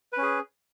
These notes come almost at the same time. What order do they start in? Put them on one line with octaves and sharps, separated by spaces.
B4 C#4 G#4